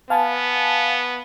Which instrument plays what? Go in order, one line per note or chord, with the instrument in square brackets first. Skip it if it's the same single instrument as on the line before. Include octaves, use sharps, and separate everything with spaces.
[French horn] B3 [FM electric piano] F5 G#5 A5